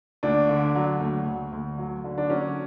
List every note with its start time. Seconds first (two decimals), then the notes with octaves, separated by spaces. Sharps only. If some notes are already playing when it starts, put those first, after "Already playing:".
0.23 D2 D4
0.49 D3
0.75 F#3
1.00 D2
1.26 D2
1.52 D2
1.78 F#3
2.04 D3
2.18 D4
2.30 F#3 C#4